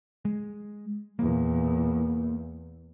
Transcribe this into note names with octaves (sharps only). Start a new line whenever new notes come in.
G#3
E2 A#2 A#3